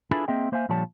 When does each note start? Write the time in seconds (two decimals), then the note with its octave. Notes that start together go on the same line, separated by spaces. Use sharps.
0.11 D4 E4 F4 G#4 A4 B4
0.28 A#3 C4 G#4 D#5 E5 G5
0.52 A#3 C5 E5 F5 G#5
0.69 A#2 D3 F3 G3 C#5 A5